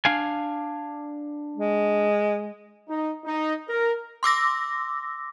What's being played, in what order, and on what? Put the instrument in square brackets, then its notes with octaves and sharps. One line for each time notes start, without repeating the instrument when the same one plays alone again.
[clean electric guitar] D4 F5 G#5
[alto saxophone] G#3
[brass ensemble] D#4
D#4
A#4
[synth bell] C6 D6 E6 A#6